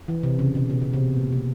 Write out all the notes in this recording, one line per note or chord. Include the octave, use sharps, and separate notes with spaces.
E3
C3
C#3
B2
B2
B2
C3
A#2
B2